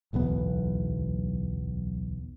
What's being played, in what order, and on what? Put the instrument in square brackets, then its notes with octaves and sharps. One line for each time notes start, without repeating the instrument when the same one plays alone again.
[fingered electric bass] D1 B1 E2 B3